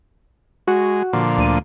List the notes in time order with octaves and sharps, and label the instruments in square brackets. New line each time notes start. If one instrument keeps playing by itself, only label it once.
[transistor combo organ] G#3 [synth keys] F#4
[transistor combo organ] A#2 D3 F3
[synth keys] D2 D#7